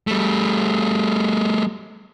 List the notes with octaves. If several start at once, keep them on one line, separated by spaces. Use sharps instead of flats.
G3 A3